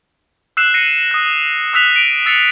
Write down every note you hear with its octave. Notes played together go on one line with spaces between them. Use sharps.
E6 F#6 C7 E7
A#6 C7 C#7 D#7
D#6 F#6
D#6 E6 F#6 B6 F7
D7 D#7
E6 A6 C7 C#7 F7